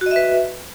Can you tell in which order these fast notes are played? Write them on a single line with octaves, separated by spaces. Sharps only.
F#4 D#5 E5 B4